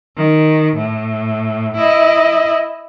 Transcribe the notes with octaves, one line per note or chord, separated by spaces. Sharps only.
D#3
A2
E4 D#5